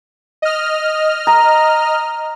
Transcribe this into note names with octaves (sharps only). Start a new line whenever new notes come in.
D#5 F6
A#5